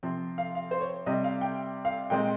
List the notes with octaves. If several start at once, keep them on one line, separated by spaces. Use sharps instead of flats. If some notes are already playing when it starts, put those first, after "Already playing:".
C3 F3 C4
F5
F5
C5
C#5
C3 G3 C4 D#5
F5
G5
F5
A#2 G#3 C4 G5